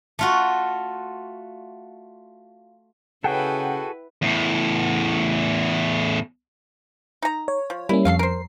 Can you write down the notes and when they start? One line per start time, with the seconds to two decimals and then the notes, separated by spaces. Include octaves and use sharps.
0.19 A3 F4 F#4
3.24 C#3 E4 F#4 G#4 A4 B4 F#5 G5
4.22 E2 A2
7.22 D#4 A#5
7.48 C#5
7.70 F3
7.89 G3 A#3 C#4 E4
8.05 F2 A4 C#5 F5 C7
8.19 A#4 C5